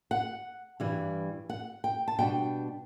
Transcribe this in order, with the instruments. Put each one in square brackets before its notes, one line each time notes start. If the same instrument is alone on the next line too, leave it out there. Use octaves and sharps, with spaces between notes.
[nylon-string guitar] F#5
G2 E3 G3
F#5
G5
A5
B2 G3 B3 D4 G5